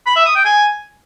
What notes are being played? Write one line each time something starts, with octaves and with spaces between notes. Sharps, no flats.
B5
E5
D#6
G5
G#5